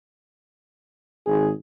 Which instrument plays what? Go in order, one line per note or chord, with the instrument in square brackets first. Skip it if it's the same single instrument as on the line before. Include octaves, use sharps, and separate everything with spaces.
[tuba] G#1 [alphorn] G#4